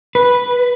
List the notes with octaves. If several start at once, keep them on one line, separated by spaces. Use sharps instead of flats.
B4